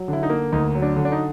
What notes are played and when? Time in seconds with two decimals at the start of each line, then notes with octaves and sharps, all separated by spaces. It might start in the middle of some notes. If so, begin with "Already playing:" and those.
Already playing: F#3
0.08 D3 E4
0.23 D#4
0.30 A#3
0.52 D2 D#4
0.75 F#3
0.82 D4
0.97 D3
1.05 D4
1.12 D#4